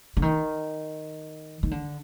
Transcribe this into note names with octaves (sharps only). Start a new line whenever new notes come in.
D3
D#3
D#3
D3